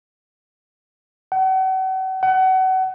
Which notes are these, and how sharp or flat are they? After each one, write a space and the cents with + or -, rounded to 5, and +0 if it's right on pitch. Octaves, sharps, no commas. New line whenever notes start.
F#5 +40
F#5 +30